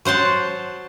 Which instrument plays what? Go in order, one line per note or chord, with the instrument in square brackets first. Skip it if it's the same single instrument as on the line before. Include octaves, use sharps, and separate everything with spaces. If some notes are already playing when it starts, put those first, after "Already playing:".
[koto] F#3 C5 F#5 A5